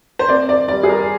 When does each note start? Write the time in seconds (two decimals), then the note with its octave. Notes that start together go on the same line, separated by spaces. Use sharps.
0.19 C5
0.28 C4 D5
0.49 D5
0.68 G3 D5
0.83 G#4
0.89 A#4